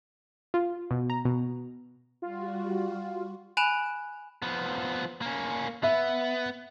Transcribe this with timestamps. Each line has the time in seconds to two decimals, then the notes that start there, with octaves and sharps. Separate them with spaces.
0.54 F4
0.91 B2
1.10 A#5
1.25 B2
2.22 G3 F4 F#4
3.57 G#5 B5 F#6 D7 E7 F7
4.42 F3 B3
5.22 A#3 C#4
5.83 B3 E5